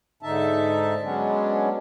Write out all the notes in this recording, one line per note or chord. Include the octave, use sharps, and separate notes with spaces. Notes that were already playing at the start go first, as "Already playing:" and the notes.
G#2 D3 D#4 E5 A5
F#3 G#3 B3 C#4 D4